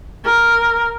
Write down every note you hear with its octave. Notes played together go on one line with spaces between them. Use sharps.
A#4